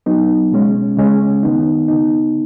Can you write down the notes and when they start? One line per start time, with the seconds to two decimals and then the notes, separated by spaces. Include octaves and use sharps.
0.06 F#3 B3 D#4
0.52 B2 G#3 C#4
0.97 C#3 G#3 C#4
1.43 D#3 B3 D#4
1.88 C#3 B3 D#4